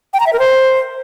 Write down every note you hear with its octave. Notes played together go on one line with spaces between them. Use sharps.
G5
A#5
E5
A#4
C5